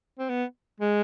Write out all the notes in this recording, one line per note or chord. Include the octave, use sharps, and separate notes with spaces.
C4
B3
G#3